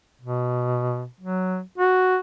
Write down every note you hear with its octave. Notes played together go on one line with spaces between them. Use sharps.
B2
F#3
F#4